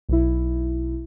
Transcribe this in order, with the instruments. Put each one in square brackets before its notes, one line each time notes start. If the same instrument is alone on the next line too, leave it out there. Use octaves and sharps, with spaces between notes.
[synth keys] B1 B2 E4